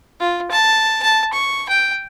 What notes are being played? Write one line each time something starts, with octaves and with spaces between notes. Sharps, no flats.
F4
A5
A5
C#6
G5